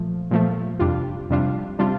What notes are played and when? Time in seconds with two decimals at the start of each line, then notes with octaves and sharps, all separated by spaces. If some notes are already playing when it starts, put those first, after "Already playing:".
Already playing: A#2 F3 A3
0.31 A#2 F3 A3
0.79 F2 C3 G3 D4 F4
1.30 F2 C3 G3 D4 F4
1.79 C3 G3 D4 F4